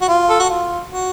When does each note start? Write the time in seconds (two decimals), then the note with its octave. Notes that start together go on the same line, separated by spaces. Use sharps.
0.01 F#4
0.08 F4
0.30 A4
0.40 F#4
0.50 F4
0.91 F#4